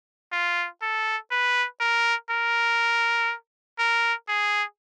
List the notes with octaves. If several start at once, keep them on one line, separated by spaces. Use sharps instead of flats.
F4
A4
B4
A#4
A#4
A#4
G#4